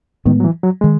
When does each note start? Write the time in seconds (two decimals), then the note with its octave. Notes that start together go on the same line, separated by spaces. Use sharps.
0.25 A2 D#3 G#3 B3
0.40 F#3
0.44 E3
0.64 F#3
0.81 D#3 G#3